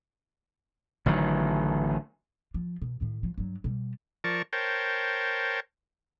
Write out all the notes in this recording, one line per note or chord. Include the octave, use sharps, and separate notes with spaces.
A1 D3 D#3 F#3
F3
B2
A2 D#3
F3
G2 F#3
B2 G3
F3 A#4 D5 A5 C#6
A#4 C5 C#5 G5 A5